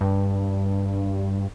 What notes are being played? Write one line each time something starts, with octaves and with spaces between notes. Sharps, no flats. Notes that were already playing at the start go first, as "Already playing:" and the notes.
G2